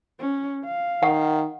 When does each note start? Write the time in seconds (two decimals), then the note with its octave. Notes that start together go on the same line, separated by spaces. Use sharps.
0.19 C#4
0.65 F5
1.03 D#3 F#5